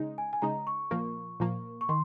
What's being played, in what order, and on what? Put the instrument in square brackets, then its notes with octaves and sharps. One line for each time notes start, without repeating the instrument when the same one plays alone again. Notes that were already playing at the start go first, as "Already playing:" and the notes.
Already playing: [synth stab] C#3 G#3 D#4
[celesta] G#5
G#5
[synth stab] C#3 G#3 D#4 [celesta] A#5
[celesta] C#6
[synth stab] A#2 F3 A#3
A#2 F3 A#3
[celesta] C#6
[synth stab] D#3 [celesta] C6